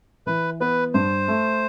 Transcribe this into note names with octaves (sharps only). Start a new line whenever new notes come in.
E3 B4
B3 B4
G2 C5
A3